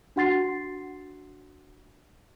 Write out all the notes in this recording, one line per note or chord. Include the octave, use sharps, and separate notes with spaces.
D4 F#4 F#5 C6 A6 C7